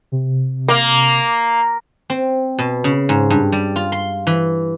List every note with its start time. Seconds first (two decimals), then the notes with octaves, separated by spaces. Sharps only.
0.12 C3
0.68 A#3
2.10 C4
2.59 B2
2.84 C#3
3.09 G#2
3.30 G2
3.52 G3
3.76 F4
3.92 C6
4.27 E3